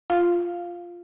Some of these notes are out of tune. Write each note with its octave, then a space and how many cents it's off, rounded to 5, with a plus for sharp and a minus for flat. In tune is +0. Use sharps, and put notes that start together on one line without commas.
F4 +0 F5 +0